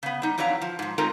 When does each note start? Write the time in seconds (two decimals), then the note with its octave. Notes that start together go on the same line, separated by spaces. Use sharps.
0.03 C#3 B3
0.22 G3 D#4
0.38 F2 E3 F#3 D4 F5 A#5
0.62 F3
0.79 G#2 F3
0.98 G#3 A3 C4 D#4 F4 A#4